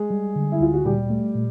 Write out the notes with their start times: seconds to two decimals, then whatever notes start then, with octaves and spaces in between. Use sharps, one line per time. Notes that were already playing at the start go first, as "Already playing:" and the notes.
Already playing: G#3 G#4
0.10 G3
0.36 D3
0.52 E4
0.60 D2 F4
0.74 F#4
0.85 A#2 G3 G4
1.10 A3
1.35 A#2